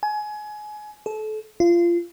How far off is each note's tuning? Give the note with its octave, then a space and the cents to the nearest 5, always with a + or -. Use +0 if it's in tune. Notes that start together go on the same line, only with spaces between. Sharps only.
G#5 +25
A4 -30
F4 -25